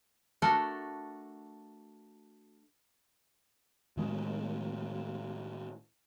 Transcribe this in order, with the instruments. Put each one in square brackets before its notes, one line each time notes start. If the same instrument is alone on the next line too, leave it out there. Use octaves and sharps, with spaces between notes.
[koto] A3 D4 F#4 A4 A#4
[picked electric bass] A2 D#3 G#3 C#4